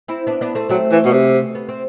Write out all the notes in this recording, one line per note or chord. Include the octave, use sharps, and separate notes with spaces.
C4 E4
B3 D4
B3 D4
A3 C4
F#3 A3 C4
E3
B2
C3
B3
C4